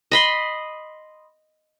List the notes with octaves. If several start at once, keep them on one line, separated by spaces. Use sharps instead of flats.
D#5 B5 C6